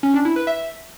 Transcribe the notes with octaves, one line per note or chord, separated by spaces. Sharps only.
C#4
D4
E4
B4
E5